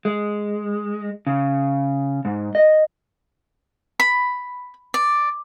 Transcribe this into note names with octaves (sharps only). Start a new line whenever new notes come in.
G#3
C#3
G#2
D#5
B5
D5